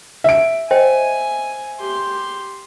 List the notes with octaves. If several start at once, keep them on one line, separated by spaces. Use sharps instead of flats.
E5 D7
C5 D#5 G5 G#5
G4 C6